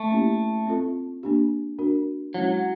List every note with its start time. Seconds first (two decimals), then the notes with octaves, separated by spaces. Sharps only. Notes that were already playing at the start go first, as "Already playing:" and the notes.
Already playing: A3
0.11 A#3 C#4 E4 G4
0.67 C4 F4 A4
1.23 A#3 D4 G4
1.79 D4 F#4 A#4
2.34 F#3 G#3 C#4 E4